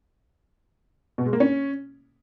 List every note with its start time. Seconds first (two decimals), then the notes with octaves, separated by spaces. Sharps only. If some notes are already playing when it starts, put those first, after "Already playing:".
1.18 B2
1.26 G#3
1.33 A#3
1.40 C#4